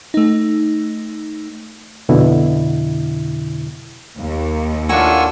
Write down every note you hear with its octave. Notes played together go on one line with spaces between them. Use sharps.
A3 D#4
F2 B2 D3 E4
D#2
A2 D4 F4 A#4 F#5 G#5 C#6 E6